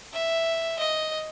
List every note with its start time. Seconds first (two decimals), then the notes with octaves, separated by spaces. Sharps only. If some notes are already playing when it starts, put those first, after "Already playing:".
0.13 E5
0.79 D#5